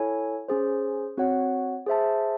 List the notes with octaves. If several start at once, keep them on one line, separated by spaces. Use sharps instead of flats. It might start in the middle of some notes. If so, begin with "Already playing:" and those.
Already playing: E4 A4 C#5 G#5
C#4 G#4 C5
C4 F#4 C#5 F#5
G#4 C5 E5 A5